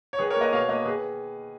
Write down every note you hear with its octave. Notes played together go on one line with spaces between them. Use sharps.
C#5
D#3 G#4 B4
A#4 C#5
A#3
B4 D#5
B2 C#5 F5
A#3 B4 D#5
D#3 G#4 B4